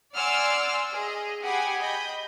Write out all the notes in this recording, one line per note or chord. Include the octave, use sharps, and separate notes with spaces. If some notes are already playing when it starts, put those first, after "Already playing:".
D5 F#5 G#5 C6 E6 F6
G#4 D#5
G4 G#4 F#5 G#5 B5
D#5 B5 G6